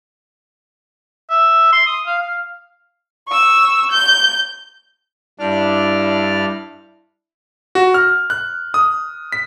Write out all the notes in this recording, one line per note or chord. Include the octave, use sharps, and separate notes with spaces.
E5
C6
D#6
F5
F5
C#6 E6
G6
G2 D4 E4 D5 F6
F#4
F6
F#6
D#6
B6